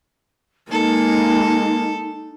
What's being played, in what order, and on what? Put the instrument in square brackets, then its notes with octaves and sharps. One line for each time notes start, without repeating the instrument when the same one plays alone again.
[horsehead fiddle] G#3 A#3 [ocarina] D#4 [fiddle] A4